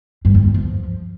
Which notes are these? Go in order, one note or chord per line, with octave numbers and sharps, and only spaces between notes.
G2
F#2
F2
F3